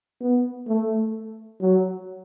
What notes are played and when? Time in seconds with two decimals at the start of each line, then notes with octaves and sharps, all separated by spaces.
0.21 B3
0.67 A3
1.61 F#3